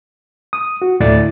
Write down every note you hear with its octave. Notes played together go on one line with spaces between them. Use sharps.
D#6
F#4
D2 A2 E4 D5 A6